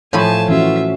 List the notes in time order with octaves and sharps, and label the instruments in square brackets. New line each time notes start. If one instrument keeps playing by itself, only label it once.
[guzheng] A2 F3 B5 [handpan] C#5 [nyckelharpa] G#5 A5
[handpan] E3 C#4 F#4 [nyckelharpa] F4 E5